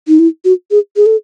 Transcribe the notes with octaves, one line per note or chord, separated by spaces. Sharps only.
D#4
E4
F#4
G#4
G#4
A4